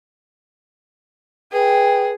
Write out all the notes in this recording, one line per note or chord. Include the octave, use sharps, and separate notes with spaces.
G#4 B4 G5